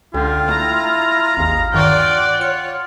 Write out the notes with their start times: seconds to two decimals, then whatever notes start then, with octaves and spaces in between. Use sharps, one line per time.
0.14 C#2 D3 F4 G5
0.49 A3 E4 A#5
1.37 G#1 D#2 G#3 F5
1.74 G2 D#3 F4 D5 F#5 G5 C#6
2.41 F4 C#5 C#7